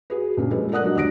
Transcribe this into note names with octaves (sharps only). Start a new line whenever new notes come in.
F#4 G#4 B4
A#2 C#3 D4
F3 G3 G#3 A4 B4
A#4 D5 F#5 D#6 F#6
F#3 D4 D#4
D#2 D3 D#6 A#6 D7